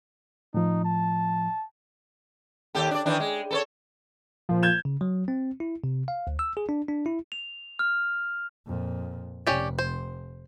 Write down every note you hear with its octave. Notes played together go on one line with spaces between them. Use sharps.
A2 F3 D#4
A5
D#2 G4 A4
D4 D5
D#3 E3 D4
G#3
A4 B4 C#5
A#2 F3
G6 G#6 E7
C#3
F#3
C4
E4
C3
F5
D2
E6
G#4
D4
D4
E4
F7
F6
F2 A#2
F1 C#4 G4 D5
C5